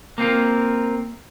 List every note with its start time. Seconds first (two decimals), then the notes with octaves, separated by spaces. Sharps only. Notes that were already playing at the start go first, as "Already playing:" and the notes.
0.18 A#3 C4 F4 A#4